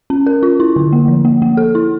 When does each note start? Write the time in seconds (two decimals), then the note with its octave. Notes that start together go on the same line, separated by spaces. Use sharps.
0.10 C#4
0.27 A#4
0.43 F4
0.60 E4
0.76 D3
0.93 A#3
1.08 F3
1.25 A#3
1.42 A#3
1.57 A4
1.75 E4